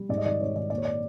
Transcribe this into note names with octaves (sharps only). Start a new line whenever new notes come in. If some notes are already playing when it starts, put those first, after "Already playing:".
Already playing: G3
G#2 D5
D#5
D#3 D5
D#3 C#5
D#3 D5
A#2 D5
C#5
D5